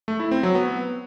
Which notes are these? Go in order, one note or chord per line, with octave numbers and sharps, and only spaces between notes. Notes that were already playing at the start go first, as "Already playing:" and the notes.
A3
E4
C4
F#3
B3